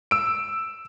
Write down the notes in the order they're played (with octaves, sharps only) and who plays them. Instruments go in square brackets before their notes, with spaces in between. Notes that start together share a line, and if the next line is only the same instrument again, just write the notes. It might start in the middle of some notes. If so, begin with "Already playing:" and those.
[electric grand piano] E6 D7